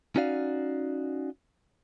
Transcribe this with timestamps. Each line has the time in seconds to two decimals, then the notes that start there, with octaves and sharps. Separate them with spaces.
0.16 C#4 D#4 F#4 D5 F5